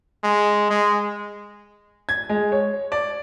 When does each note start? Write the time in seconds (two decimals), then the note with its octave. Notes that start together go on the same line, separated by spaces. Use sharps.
0.24 G#3
0.71 G#3
2.09 G#6
2.29 G#3
2.52 C#5
2.92 D5